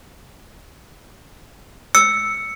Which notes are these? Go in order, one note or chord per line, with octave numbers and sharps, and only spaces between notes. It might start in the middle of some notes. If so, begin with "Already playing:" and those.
E6 C#7